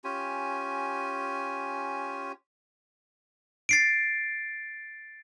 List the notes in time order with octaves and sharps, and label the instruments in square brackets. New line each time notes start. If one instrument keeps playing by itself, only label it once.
[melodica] C#4 F4 G4 G#5
[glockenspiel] A6 C7 D7